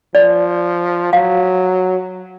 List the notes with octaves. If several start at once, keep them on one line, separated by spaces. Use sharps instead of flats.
F3 D5
F#3 F5